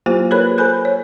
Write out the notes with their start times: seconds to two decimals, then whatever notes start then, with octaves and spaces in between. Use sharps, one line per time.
0.06 F#3 A#3 E4 F4 G4 C5
0.31 G#4 A#4 B4 C#5 B5 F#6
0.58 A4 C5 G#5 B5 F#6 G6
0.85 C#5